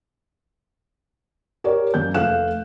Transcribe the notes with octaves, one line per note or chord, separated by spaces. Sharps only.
G4 A#4 C#5 D5
F#2 A#3 G6
F1 A3 F5 F#6 E7